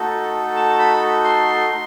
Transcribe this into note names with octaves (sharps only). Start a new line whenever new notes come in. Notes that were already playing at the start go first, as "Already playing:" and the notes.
Already playing: A3 D#4 F#4 A4
A5
B5
C6
D#4